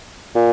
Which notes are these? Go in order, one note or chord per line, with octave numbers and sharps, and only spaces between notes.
A#2